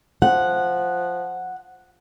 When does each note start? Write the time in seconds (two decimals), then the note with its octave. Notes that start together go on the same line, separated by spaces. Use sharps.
0.22 F3 F#5